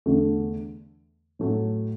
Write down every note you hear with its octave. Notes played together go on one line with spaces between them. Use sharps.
E2 D3 A3
A2 F#3 A3